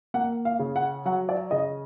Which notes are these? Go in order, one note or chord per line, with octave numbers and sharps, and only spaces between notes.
A#3 F#5
F5
C#3
F#5
F#3 F#5
D5
C#3 D#5